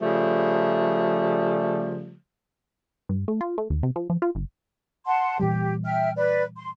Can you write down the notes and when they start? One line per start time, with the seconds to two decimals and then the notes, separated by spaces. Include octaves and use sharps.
0.01 C#3 F3 G3 A3
3.09 G2
3.28 A3
3.41 F4
3.58 A3
3.70 D#2
3.83 C3
3.96 F3
4.10 F3
4.22 F4
4.35 G1
5.06 F#5 A5 C6
5.39 A#2 E3 G3 G4
5.84 E5 G5 F6
6.16 B4 D5
6.58 C6